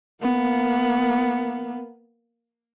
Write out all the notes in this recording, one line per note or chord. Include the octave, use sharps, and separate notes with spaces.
A#3 B3